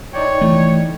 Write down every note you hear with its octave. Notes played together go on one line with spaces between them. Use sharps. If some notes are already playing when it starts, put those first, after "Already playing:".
D#4 C#5 D5 G5
E3 A3